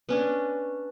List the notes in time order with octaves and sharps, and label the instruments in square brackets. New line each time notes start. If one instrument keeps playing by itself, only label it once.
[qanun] B3 C#4 D4